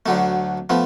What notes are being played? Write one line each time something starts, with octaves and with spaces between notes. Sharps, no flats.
D2 D3 F#3 A3
F3 A3 B3